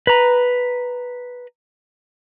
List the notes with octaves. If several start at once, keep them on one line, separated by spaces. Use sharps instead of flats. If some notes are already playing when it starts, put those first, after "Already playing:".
B4 A#5